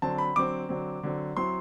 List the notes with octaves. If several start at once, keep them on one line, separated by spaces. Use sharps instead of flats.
D3 F#3 C4 A5
B5
D3 F#3 C4 D6
D3 F#3 C4
D3 F#3 C4
F#3 C4 E4 C6